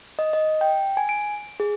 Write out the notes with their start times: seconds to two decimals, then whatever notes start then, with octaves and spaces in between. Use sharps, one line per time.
0.19 D#5
0.33 D#5
0.61 G5
0.97 G#5
1.09 D7
1.60 G#4